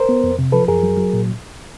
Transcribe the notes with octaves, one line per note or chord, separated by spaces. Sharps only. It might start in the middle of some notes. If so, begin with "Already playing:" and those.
Already playing: A#4 C5
B3
F2
C3
F3 A4 B4
F#2 G#4 A#4
F#3
F#3
A#2